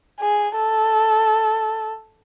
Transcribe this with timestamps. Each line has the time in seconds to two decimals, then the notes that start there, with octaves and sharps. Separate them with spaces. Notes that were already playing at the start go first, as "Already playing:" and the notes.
0.20 G#4
0.56 A4